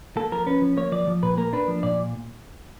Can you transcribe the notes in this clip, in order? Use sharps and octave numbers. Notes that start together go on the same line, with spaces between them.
A#3 A4
F3 A#4
C#4 B4
F3
A#3 C#5
F3 D5
F3
A#2 B4
A#3 A#4
D4 B4
F3
A#2 D5